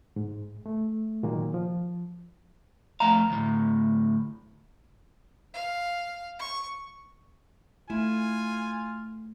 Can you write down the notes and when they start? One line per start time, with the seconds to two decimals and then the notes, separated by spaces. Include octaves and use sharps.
0.16 G#2
0.66 A3
1.23 A#2 D#3 F#3 G#3 A#3
1.54 F3
3.00 F2 A3 F5 A#5
3.30 D2 A2
5.54 F5
6.39 C#6
7.90 A3 E4 F4 G#5